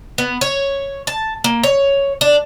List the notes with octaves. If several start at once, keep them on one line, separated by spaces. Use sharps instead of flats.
B3
C#5
A5
A#3
C#5
D4